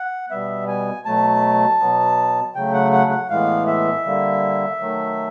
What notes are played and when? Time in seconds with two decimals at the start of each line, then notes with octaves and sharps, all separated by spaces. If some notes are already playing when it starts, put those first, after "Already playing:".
Already playing: F#5
0.30 B2 G3 B3 E5
0.68 G#5
1.05 B2 F#3 A3 A5
1.80 B2 F#3 B3
2.55 C#3 F#3 A3 G5
2.74 F#5
2.93 F#5
3.11 F#5
3.30 A2 E3 G#3 B3 F5
3.67 E5
4.05 D3 G3 A#3
4.80 D#3 F#3 A3